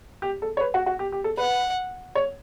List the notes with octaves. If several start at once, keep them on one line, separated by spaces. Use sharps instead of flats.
G4
A4
C#5
B4
F#4
F#4
G4
G4
A4
B4 F#5
C#5